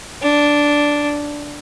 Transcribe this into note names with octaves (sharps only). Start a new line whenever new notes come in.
D4